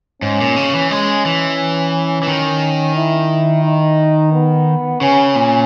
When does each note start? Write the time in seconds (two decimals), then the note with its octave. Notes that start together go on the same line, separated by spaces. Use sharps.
0.22 G#2 C#4
0.40 A#2
0.56 C#3
0.74 E3
0.91 G#3 C#4
1.26 E3
2.23 E3
2.27 D#3
2.96 E4
3.64 D#4
4.33 B3
5.01 C#3 C#4
5.35 A#2